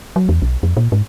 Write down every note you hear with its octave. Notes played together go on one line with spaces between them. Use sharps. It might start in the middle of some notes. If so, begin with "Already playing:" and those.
F#3
E2
B1
F2
A#2
G#2